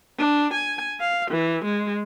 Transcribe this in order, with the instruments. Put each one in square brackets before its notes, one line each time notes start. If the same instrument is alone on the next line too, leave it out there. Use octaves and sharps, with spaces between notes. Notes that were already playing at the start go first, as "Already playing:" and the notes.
[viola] D4
G#5
F5
E3
G#3